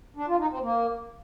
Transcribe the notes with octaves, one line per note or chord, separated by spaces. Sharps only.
D4
F4
D#4
C4
A#3